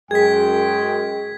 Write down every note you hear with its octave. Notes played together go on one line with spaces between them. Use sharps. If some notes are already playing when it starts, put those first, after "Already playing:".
F#2 G#3 G#4 G5 G#6 B6